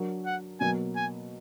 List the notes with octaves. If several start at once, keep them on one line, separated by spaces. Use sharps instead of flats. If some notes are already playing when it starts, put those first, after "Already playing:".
Already playing: F#3 D4 F#4 A#4
F#5
B2 F#3 A#3 G#5
G#5